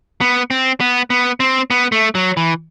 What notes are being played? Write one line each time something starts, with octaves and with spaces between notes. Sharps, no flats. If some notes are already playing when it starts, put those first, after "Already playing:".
B3
C4
B3
B3
C4
B3
A3
F#3
E3